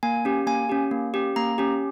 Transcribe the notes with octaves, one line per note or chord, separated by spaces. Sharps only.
A#3 G#5
C#4 G4
A#3 G#5
C#4 G4
A#3
C#4 G4
A#3 A#5
C#4 G4